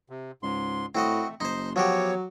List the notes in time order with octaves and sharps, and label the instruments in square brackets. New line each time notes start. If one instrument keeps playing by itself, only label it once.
[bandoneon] C3
[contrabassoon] C#2 [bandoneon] G#2 C6
[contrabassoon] A2 [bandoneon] A3 [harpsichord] C4 F#4 D#5
[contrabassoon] F#1 [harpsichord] D#4 C5 [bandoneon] C6
[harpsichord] F3 F#4 G4 [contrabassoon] F#3 [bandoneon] B3 C#5